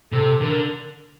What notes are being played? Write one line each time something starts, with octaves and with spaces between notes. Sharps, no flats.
C3 A4
D3 A#4